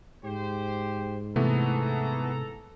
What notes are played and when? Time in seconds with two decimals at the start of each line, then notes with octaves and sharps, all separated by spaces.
0.24 G#2 G4 C5
1.36 C3 E3 A3 B3 A4 A#5